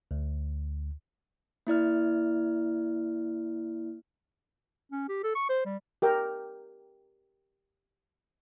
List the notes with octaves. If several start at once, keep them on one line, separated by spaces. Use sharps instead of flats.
D2
A#3 E4 D5 F6
C#4
G4
A4
C#6
C5
G3
G4 A#4 G5